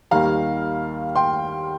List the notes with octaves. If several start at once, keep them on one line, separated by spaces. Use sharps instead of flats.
D#2 D#3 G3 F5 A#5
G5 C6